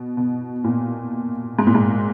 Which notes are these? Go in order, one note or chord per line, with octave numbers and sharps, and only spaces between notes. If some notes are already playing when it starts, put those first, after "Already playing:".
Already playing: B2
B2
A#2
G#2
A#2
G#2